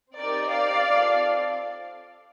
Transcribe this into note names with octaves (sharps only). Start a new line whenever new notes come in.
C4 D#4 G4 A#4 D5
D5 F5
C4 F4 A4